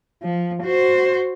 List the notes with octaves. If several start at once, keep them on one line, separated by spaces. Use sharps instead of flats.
F3
F#4 C5